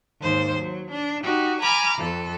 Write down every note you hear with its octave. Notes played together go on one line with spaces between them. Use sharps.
D#2 G#2 C5
F#3
D4
D#4 F#4 G4
G#5 A#5 B5 D6 F6
F2 A4